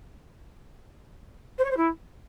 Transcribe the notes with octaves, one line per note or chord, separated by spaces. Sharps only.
C5
C#5
C5
E4